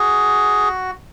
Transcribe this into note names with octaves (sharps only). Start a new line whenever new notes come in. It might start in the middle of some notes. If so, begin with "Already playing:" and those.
Already playing: F#4 G#4